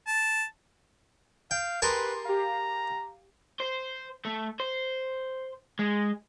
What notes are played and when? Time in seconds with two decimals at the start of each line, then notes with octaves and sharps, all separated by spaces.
0.07 A5
1.51 F5 G5
1.82 G4 G#4 A#4 B4 A5 C6
2.25 G4 F5 A#5
3.60 C5
4.25 A3
4.60 C5
5.79 G#3